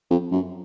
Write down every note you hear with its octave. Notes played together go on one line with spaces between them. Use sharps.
F2
F#2